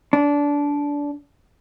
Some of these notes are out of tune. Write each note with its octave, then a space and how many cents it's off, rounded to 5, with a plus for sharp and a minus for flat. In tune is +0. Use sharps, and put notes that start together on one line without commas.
D4 -20